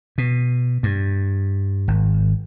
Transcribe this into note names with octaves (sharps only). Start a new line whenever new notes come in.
B2
G2
G#1